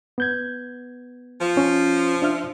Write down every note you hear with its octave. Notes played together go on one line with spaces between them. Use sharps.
B3 G6 G#6
F3
C#4
D4 E5 F6